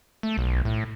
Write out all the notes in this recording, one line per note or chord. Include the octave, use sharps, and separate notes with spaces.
A3
B1
A2